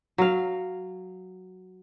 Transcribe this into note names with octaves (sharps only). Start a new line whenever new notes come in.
F#3 F5